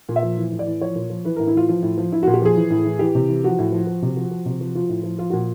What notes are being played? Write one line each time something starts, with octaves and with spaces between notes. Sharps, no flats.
A#2
E5
F3
E3
A2
D5
E3
F3 C#5
A#2
F3
E3 B4
A2 A#4
E4
E3 F4
F3 F4
A2
F3
F3 E4
A#2 F#4
G4
F3 G#4
E3
A2
E3
E3 G4
C3
E3
F3 F#4
A2
F3
F3
C3
F3
F3
C3
F3
F3 F4
A2
F3
F3 F4
F#4
A#2